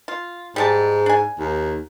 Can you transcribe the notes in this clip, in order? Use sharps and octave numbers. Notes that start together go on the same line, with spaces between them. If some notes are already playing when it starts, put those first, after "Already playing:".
F4
G#2 G3 G#3 A5
D4 G#5
D#2